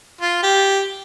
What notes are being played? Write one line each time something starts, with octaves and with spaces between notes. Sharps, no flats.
F4
G4